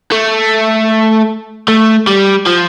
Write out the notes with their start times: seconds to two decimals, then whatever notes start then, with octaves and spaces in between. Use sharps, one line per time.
0.12 A3
1.68 A3
2.07 G3
2.47 F3